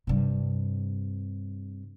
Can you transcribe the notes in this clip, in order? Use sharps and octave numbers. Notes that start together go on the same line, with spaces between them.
G2 C3